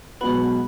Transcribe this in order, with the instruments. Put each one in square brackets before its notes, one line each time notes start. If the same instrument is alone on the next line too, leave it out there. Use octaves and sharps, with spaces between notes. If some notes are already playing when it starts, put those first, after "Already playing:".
[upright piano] B1 B2 G#3 B3 F#4 [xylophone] B4 B5